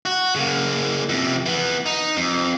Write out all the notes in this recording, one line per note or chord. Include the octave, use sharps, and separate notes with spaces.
F#4
C#3 A#3
F2 C3
E3 B3
D#4
F2